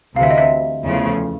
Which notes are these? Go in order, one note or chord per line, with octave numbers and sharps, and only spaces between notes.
D2 C3 E3 F5
E5
D#5
E5
E2 C#3 F3 A3